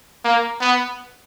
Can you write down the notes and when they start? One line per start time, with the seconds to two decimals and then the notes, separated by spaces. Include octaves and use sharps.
0.24 A#3
0.61 B3